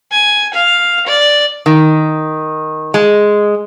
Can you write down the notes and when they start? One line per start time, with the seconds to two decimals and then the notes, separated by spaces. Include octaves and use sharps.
0.12 G#5
0.54 F5
1.07 D5
1.66 D#3
2.94 G#3